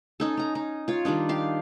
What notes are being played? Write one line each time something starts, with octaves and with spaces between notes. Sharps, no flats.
C#4 D#4 A4
C#4 A#5
D#4
F4 C#5
D#3 G3 D4 D#4
G4 F5 C6